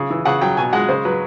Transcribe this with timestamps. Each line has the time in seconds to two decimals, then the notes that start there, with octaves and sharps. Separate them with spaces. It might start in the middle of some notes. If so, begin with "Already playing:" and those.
Already playing: C#3
0.10 E3
0.25 C#3 F#5
0.41 F#3 G5
0.57 B2 G#5
0.73 G#3 F#5
0.88 C#3 C5
1.05 F#3 B4